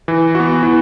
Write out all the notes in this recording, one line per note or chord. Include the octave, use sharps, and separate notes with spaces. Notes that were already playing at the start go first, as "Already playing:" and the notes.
E3
B3 F#4
E3